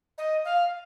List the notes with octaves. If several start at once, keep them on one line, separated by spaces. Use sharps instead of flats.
D#5
F5